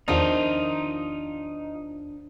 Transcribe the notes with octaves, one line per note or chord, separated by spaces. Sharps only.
E2 D#3 F3 D4 D#4 F4 C5